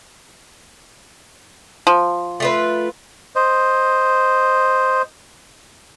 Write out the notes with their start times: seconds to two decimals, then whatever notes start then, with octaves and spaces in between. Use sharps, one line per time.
1.87 F3
2.40 A3 F4 B4
3.36 C5 D#5